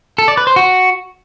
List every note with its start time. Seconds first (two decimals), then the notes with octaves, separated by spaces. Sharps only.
0.18 A4
0.28 D5
0.37 B4
0.47 C5
0.56 F#4